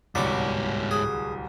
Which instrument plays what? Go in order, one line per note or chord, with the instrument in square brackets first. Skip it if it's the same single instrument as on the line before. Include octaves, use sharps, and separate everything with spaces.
[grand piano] D1 C2 [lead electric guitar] G#2 C#5 [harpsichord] D5 D6
[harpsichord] G#4